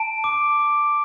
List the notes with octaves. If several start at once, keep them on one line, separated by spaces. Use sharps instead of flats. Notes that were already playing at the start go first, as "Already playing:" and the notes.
Already playing: A5 D7
D6
D6